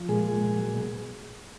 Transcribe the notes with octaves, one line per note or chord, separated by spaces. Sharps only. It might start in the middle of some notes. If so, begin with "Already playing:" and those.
Already playing: F3
A#2 G#3 G#4
G#3
A#2
F#3
B2